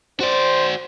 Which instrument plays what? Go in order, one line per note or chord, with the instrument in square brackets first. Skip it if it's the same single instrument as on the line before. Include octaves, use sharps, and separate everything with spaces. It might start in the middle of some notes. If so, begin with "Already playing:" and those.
[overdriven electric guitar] F#4 D5 [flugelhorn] C5